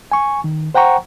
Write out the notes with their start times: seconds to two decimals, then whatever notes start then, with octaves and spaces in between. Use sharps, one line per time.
0.12 G#5 C#6
0.44 D#3
0.75 C5 F#5 G5 A#5 C#6